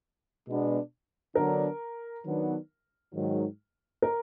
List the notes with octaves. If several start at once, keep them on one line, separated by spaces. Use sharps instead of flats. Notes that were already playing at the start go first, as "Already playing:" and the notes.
B2 G#3 B3 D4
D3 F#3 B3 D4 A#4
D#3 F#3 B3 D4
G#2 D#3 F#3
A#4